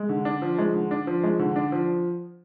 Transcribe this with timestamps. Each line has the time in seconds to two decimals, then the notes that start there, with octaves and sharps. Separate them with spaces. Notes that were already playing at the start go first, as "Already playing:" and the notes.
Already playing: G#3
0.09 D3
0.25 D4
0.42 F3
0.58 G#3
0.74 D3
0.91 D4
1.07 F3
1.24 G#3
1.39 D3
1.56 D4
1.72 F3